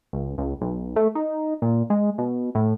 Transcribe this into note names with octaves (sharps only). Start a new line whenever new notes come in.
C#2
C#2
B1
A3
D#4
A#2
G#3
B2
A2